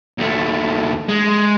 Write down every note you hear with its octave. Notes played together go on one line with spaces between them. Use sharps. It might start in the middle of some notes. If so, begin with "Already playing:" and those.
D#2 A3
G#3